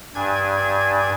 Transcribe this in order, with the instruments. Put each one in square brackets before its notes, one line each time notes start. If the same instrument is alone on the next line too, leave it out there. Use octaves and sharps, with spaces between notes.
[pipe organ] G2 D4 G#5 G#6